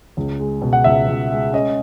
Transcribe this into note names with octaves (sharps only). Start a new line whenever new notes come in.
C#2
G#3
B2
F#5
C#2 E5
C#2
G#3
C#4 D#5